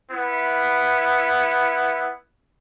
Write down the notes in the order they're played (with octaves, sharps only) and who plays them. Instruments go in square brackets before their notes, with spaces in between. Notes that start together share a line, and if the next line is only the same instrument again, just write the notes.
[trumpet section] B3 E4